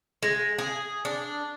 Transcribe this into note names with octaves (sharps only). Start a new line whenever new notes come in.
G#3
G#4
D4